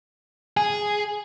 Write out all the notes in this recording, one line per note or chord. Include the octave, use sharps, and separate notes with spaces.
G#4 G#5